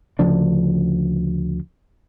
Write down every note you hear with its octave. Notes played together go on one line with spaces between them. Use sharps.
D2 C#3 F3 D4